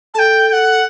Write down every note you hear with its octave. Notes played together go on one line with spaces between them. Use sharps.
A4 G5 A5
G5
F#5